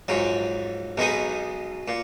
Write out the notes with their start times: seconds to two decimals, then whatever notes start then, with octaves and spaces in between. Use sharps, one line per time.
0.08 A#1 G#2 F#3
0.97 B1 B2 G#3 B3 D#4
1.88 A#2